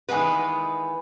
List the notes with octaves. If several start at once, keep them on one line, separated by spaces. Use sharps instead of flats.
D#3 E3 G#3 B3 B4